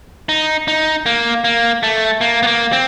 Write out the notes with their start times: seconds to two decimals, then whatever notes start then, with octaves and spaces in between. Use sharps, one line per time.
0.29 D#4
0.68 D#4
1.06 A#3
1.44 A#3
1.83 A3
2.21 A#3
2.43 B3
2.47 A#3
2.73 C4